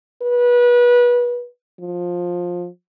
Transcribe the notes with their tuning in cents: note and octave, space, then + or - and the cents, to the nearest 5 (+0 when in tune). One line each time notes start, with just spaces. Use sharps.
B4 -25
F3 +15